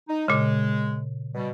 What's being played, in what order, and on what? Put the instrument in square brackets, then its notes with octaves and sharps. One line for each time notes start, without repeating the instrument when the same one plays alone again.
[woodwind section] D#4
[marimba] A#2 C#3 [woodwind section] G#3
[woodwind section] B2 G3